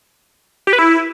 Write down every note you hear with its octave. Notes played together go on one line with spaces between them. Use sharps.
G4
B4
E4